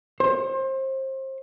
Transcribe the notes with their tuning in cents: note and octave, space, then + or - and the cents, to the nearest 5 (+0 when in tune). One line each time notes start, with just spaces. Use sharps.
C5 +30